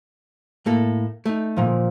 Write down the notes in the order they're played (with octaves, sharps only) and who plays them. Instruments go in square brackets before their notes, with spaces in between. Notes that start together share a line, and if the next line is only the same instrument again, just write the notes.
[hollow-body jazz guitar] A2 A#3 A4
A3 D#4
[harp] A#2 F3